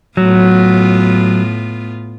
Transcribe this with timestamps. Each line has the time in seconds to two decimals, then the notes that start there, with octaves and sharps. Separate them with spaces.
0.17 A2 F#3 B3 F4